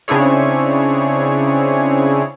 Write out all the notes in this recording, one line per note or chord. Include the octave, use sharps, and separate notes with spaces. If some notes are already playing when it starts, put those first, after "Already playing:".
C#3 C4 D4 E4 G#4 C#5